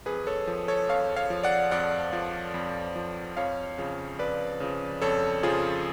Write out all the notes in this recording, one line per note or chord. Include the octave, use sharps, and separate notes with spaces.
F2 G#4 B4
A4 C#5
F3
A4 C#5
F2 C#5 F5
C#5 F5
F3
D5 F#5
F2 D5 F#5
F3
F2
F3
F2 C#5 F5
C#3 F3
F2 B4 D5
C#3 F3
F2 A4 C#5
C#3 F3 F4 G#4